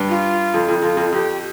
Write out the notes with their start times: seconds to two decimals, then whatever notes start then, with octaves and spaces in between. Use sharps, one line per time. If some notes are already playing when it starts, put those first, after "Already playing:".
Already playing: G2
0.09 F4
0.54 F2
0.68 F2
0.82 F2 F4
0.97 F2
1.12 F2 G4